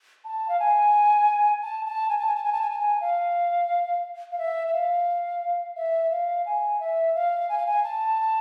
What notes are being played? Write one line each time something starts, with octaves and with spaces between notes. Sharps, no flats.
A5
F5
G#5
A5
A5
G#5
A5
G#5
A5
G#5
A5
G#5
A5
G#5
F5
F5
E5
E5
F5
E5
F5
G#5
E5
F5
G#5
F5
G#5
A5